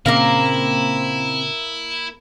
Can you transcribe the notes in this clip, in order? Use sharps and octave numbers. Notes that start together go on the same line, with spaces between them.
A#2 C#3 A#3 C4 E4 A#4 F5